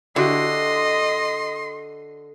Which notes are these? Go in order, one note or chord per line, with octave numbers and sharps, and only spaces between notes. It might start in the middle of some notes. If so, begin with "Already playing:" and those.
D3 E4 F#4 G4 D#5 C6